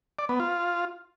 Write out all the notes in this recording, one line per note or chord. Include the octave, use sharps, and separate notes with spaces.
D5
B3
F4